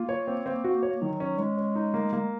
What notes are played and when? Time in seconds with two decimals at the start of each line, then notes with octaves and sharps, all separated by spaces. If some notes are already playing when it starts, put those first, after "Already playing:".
Already playing: A#3 F4
0.09 C#5
0.27 C4
0.46 C4
0.64 F#4
0.83 C#5
1.02 D#3 F#3
1.20 C#4
1.38 G#3 C#4
1.57 C#4
1.75 D#4
1.94 A#3
2.13 A#3